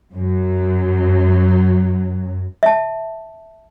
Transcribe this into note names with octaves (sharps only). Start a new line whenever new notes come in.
F#2 F#3
E5 A5